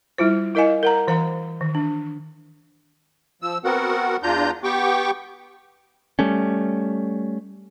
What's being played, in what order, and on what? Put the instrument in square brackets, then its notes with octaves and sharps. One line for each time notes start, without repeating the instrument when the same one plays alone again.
[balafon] G3 E4 F4 C5
E4 A#4 D#5 F5 G#5
A#4 F#5 A#5
E3 C5 F5 A#5
D#3
D4
[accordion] F3 E6
B3 C4 F#4 A#4 F#5
E2 D4 F4 A#5 G6
B3 G4 G5 C#6 D6
[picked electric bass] G3 A3 C#4